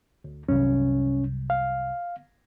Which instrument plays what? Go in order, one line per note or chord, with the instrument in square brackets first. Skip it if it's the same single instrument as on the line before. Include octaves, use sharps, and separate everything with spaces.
[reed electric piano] D2
[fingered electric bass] C2 F#2 [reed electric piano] C#4
[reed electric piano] F5